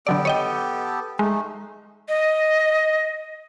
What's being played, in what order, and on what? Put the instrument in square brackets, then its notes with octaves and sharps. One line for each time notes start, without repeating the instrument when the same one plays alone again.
[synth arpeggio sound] D3 F#3 D5 [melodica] B3 G4 A4
[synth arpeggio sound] C#5 D#5 G5
[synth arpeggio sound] G#3 [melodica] A3 D#4
[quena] D#5